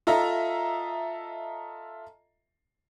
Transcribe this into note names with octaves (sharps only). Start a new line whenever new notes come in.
F4 A4 D#5 E5 A#5